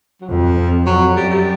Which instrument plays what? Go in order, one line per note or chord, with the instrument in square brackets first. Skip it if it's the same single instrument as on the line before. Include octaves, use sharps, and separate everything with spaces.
[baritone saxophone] F#3
[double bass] F2 [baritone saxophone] F3
[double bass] F2
[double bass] F2 [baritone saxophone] F#3
[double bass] F#2 [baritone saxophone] G3
[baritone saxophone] G3